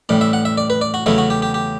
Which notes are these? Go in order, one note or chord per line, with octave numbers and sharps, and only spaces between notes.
A1 A2 G3
E5
F#5
E5
D5
B4
D5
F#4
E2 C#3 F#3 A3 E4
F#4
G4
G4
G4